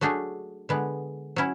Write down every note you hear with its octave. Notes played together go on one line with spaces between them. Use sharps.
F#3 A3 D4 G#4
D3 G#3 B3
F#3 C#4 E4